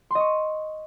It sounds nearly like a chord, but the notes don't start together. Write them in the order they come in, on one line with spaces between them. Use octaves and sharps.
C6 D#5 C#6